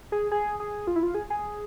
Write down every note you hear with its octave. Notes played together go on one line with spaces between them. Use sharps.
G#4
G#4
G#4
F4
E4
F4
G#4
G#4